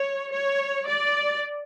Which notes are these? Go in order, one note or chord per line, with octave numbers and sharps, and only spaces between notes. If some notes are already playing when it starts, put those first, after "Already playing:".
Already playing: C#5
C#5
D5